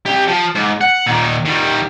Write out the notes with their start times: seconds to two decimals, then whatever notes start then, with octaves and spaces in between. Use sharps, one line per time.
0.06 C2 G4
0.28 F3
0.55 G#2
0.81 F#5
1.06 A#2 D#3
1.45 D#3 G3